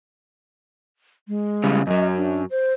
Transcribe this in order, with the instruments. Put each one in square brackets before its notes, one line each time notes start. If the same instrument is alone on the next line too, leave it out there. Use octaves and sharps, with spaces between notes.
[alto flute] G#3
[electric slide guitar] C#3 G3
[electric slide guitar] F#2 F#3 [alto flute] D#5
[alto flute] D4
C5